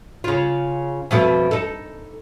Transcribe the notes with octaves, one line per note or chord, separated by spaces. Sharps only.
C#3 F4
F2 B2 A3
D#4 A4